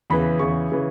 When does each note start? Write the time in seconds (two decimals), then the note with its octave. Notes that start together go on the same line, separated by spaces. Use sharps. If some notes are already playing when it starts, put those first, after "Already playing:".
0.10 E2 C#3 E3 B5
0.39 E2 C#3 E3 C#6
0.72 C#3 E3